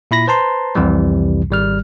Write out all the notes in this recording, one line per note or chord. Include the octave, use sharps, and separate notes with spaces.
A#2 E4 B5 A#6
B4 C5 A5 A#5 C6
C2 F2 C3 E3 G3
G#1 G3 F6